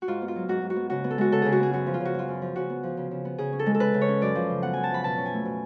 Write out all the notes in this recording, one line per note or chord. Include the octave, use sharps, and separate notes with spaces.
F#4
G#2 F4
B3
F4
F#3
G#2 F#4
G#2
F#4
B3
C#3 F#4
B3
A4
G#3 F#4
C#3 A4
C#3 G#4
F#4
B3 G#4
F#2 F#4
F3
F4
C#3
F#4
F#2 F4
F#2
F3
C#3 F#4
B3
F3
C#3
C#3
B3
C#3 G#4
C#4
A4
G#3
A4
C#3 B4
C#3
C#5
C#4
F#2 D5
F3
C#3
B3 F#5
F#2 G#5
A5
F3 B5
B2 A5
C#4
G#5
A3
B2